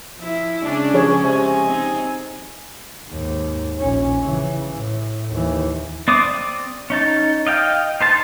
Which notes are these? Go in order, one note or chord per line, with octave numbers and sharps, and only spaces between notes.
F3 E4
C#3 G#3 C#4 D4
F3 G#4 C#5
C3 D#5 G#5
C4 D#4
D#2 G#2
A#1 C#4
C#3 E3
A2
D#2 E3
C4 D5 D6 D#6
C#4 D#4 A5
D#5 F5 G5
D#4 C5 A5